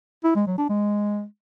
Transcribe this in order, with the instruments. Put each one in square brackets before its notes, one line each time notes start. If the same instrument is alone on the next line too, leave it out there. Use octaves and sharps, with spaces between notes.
[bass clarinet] E4
G#3
F#3
D4
G#3